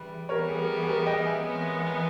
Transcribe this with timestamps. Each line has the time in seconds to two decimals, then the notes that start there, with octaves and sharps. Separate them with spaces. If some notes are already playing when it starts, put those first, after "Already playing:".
Already playing: C#3 E3 G3 B4
0.29 E3 G3 B3 A#4 C#5
0.48 G#4
0.59 A#4
0.82 G#4
0.88 A#4
1.06 D#5 G5
1.26 E5 G#5
1.45 E3 G#3 B3